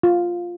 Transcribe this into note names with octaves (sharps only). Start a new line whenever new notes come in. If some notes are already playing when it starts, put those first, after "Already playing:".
F4